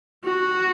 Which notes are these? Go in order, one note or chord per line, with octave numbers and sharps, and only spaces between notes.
F#4